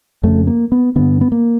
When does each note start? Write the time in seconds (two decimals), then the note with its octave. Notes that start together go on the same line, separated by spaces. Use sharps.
0.23 F2 C#3 A3
0.47 A#3
0.72 B3
0.96 G2 D3 B3
1.21 B3
1.32 A#3